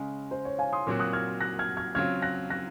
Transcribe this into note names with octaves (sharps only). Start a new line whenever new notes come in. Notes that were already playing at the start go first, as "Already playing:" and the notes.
Already playing: C#3 G#3 C#4
C5
C#5
F5 G#5
C6 D#6
A#2 F#3 C4 F#4
D#6 F#6
F6 G#6
F#6 A#6
F6 G#6
F6 G#6
C#3 F#3 C4 F4 F6 G#6
F#6 A#6
F#6 A#6